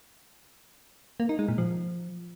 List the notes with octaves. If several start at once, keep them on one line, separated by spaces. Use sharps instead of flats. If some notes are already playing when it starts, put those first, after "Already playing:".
A#3
D#4
G#3
A#2
F3